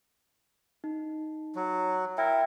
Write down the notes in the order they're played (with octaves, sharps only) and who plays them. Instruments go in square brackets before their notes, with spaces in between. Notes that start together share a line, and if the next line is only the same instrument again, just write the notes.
[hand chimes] D#4
[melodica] F#3
[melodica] E4 A#4 [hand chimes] E5 G5